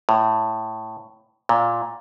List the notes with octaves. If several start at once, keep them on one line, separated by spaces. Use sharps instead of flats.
A2
A#2